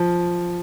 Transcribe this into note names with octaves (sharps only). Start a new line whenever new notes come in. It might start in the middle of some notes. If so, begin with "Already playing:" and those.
Already playing: F3